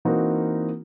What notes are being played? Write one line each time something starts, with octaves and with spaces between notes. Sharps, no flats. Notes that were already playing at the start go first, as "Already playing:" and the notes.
E3 A#3 C4 D#4 F#4 A#4